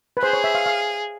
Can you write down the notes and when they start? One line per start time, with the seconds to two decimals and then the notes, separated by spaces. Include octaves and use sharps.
0.17 B4
0.22 G#4 C5
0.33 C#5
0.44 E5
0.55 F5
0.66 F5